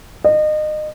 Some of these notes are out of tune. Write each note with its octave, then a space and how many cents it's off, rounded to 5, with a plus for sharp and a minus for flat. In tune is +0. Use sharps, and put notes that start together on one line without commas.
D#5 -30